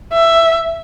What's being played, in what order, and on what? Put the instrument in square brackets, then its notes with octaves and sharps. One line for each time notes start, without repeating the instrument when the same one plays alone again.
[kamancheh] E5